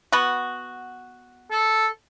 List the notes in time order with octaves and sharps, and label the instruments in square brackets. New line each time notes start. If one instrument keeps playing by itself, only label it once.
[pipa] B3 F#4
[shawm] A4